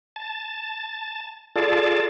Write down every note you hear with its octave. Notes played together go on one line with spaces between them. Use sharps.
A5
F4 G#4 A4 D5 A5